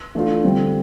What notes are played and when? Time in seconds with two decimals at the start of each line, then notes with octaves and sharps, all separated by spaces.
0.15 E3 A3 D4 F4
0.44 D3 G3 C4